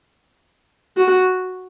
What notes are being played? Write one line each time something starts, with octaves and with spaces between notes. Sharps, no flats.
F#4